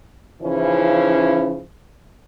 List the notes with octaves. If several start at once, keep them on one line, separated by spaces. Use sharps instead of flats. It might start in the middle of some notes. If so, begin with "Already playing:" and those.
C#3 E3 F3 C#4 D#4 E4